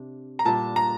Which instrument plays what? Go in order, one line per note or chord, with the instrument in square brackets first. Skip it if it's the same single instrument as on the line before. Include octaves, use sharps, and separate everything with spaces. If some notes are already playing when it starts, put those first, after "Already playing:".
Already playing: [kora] C3 D4
[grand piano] A#5
[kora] A#2 G3 D4 [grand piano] A5
[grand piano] A#5